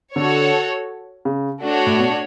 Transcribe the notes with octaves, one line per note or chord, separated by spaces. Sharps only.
D3 F#4 A4 C#5
C#3
A3 D4 F#4 C#5
A2
B2